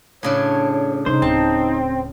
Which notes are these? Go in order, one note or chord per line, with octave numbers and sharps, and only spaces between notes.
A2 C#3 D4 C#5
C3 G3 D#4 C5
D1 C4 A5